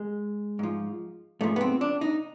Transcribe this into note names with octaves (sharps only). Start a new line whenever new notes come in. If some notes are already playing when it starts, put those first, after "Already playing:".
Already playing: G#3
G#2 F3
G#2 F3 A3
B3
C4
D4
D#4